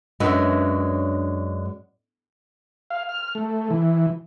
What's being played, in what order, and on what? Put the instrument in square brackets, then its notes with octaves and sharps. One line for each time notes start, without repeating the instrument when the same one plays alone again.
[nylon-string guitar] F#2 G#3 D4 B4 C#5 E5
[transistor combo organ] F5
F6
A3
E3